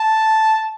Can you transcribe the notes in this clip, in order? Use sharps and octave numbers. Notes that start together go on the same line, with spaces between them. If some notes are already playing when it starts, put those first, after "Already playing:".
Already playing: A5